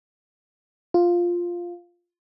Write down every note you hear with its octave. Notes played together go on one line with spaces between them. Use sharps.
F4